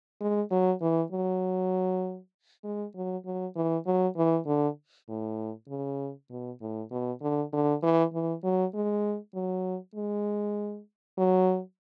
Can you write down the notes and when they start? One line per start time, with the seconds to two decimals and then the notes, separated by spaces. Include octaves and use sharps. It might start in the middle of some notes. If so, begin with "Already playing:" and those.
0.21 G#3
0.51 F#3
0.81 E3
1.12 F#3
2.64 G#3
2.95 F#3
3.25 F#3
3.56 E3
3.86 F#3
4.16 E3
4.47 D3
5.09 A2
5.69 C#3
6.30 B2
6.61 A2
6.91 B2
7.22 D3
7.52 D3
7.83 E3
8.13 E3
8.44 F#3
8.74 G#3
9.35 F#3
9.95 G#3
11.18 F#3